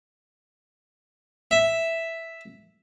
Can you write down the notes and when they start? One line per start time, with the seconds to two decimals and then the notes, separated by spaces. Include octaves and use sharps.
1.51 E5